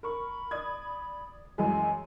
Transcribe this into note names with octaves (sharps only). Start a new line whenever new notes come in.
A#4 B5 C#6
D5 D#6 G#6
F#2 E3 G#3 G#5